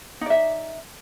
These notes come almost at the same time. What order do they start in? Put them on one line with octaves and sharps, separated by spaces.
D#4 D5 E5